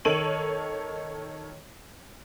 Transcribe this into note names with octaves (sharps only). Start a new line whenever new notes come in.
D#3 A4 C#5 D7 D#7 F#7